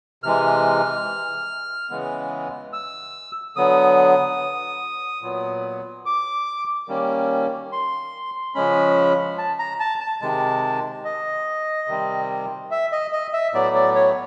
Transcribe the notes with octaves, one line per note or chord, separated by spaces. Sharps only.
C3 E3 G#3 F6
C#3 E3 G#3 B3
E6
D3 F#3 B3 D#6
A#2 F#3 B3
D6
D#3 G3 A#3 C#4
C6
C#3 F3 G#3 C#4 B5
A5
A#5
A5
A5
C3 D#3 G#3 A5
D#5
C3 D#3 G3 C4
E5
D#5
D#5
E5
A2 F#3 B3 D5
D5
C#5